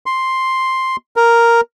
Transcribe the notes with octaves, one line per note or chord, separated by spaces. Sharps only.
C6
A#4